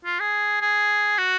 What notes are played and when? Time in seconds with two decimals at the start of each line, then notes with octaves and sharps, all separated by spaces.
0.05 F4
0.20 G#4
0.62 G#4
1.18 F#4